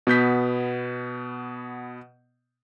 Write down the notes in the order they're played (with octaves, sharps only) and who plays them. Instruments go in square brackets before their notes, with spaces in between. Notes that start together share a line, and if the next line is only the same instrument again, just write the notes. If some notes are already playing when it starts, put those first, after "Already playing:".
[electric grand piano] B2 B3 G6 B6